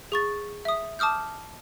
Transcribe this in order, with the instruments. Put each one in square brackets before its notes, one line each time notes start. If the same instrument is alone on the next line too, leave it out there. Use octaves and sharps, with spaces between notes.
[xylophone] G#4 C#6 A6
E5 D#6
A5 D6 D#6 F6 G6